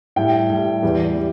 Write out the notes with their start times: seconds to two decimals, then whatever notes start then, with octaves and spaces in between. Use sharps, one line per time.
0.16 A2 G3 G5
0.49 A2 G3
0.83 E2 E3 G3
1.16 G3